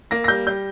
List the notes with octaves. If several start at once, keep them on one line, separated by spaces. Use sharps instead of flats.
A#3 A#6
A#6
G3 G6
G3 G6